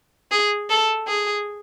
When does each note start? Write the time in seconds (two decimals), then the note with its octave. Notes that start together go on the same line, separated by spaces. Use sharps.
0.31 G#4
0.70 A4
1.08 G#4